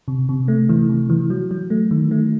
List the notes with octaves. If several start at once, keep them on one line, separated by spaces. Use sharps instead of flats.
C3
C3
A3
E3
C3
E3
F#3
F#3
A3
D#3
A3